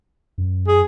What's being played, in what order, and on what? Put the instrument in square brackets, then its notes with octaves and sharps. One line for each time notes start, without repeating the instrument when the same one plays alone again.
[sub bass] F#2
[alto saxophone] G#4